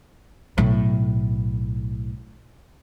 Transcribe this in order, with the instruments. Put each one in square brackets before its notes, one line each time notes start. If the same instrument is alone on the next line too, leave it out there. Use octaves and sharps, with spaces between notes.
[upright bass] B1 A2